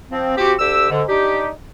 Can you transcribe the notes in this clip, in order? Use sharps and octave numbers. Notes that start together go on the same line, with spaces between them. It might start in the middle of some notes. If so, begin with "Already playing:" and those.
F3 C4
F3 C4 F#4 G4
D2 D3 G4 E6
G#2 D3
D4 D#4 G4